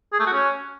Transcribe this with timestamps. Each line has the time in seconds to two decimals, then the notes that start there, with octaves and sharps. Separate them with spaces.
0.13 G#4
0.20 A3
0.26 F#4
0.33 C#4